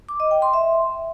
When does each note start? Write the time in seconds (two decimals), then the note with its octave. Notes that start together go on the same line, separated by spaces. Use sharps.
0.09 D6
0.20 D#5
0.31 G5
0.42 C6
0.53 E5